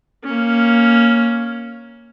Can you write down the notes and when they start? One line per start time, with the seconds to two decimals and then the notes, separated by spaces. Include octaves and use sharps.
0.24 A#3 C#4